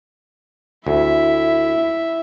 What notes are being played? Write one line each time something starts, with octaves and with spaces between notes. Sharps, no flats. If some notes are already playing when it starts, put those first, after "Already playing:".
D2 E4 E5